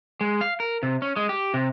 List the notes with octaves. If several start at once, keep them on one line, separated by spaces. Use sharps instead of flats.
G#3
F5
A#4
C3
C#4
G#3
G4
C3